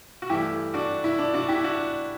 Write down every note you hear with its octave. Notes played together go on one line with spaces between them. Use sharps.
F#4
G2 E3 A3 E4 G4
D4 F#4
E4
D4
D4 F#4
E4 G4
D4 F#4